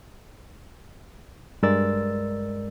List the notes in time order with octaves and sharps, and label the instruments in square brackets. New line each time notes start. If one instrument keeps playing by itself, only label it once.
[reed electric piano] G2 G#3 A#4 D5 E6 A6